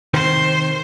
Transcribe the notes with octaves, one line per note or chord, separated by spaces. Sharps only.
C3 D#3 C4 C5